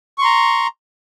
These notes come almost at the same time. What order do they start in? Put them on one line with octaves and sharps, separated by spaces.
C#6 C6 A#5